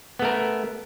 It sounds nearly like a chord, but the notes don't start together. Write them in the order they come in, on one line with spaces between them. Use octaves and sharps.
B3 A3 A#4